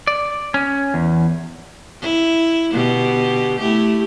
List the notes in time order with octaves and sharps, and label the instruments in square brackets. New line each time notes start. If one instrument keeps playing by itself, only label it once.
[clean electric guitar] D5
C#4
E2
[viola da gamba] E4
B2 D3 G4
A3 E4 G4